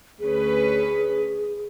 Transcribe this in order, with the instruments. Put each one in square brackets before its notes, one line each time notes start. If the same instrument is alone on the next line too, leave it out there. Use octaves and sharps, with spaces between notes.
[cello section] D2 C#4 B4 [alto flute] G#4